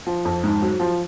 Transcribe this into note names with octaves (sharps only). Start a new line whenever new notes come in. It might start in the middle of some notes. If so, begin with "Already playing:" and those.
F3
F2
G#2
F#3
F3